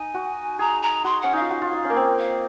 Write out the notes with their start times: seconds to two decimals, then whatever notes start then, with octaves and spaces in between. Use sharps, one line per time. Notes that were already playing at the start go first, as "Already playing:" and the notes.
Already playing: D#4 G#5
0.14 F#4
0.59 G#4 A#5
0.82 A#5
1.04 F#4 C6
1.21 C#4 F#5
1.33 D#4 F5
1.41 F4
1.50 F#4
1.62 F4
1.73 D#4
1.85 C#4
1.90 A#3
1.96 C4
2.19 F5